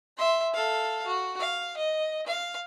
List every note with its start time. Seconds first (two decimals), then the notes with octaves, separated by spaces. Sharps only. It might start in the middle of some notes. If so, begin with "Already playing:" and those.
0.17 E5 C6
0.54 A4 F5
1.06 F#4
1.39 F5
1.77 D#5
2.26 F5